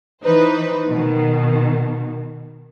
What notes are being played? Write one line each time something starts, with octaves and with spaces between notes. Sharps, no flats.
E3 D#4 B4 C5
B2 D#3